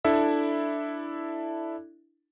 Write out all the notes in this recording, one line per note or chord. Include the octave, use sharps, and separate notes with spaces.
D4 E4 A4 E5